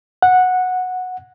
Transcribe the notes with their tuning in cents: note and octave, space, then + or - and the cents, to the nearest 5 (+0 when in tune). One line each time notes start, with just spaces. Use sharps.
F#5 -10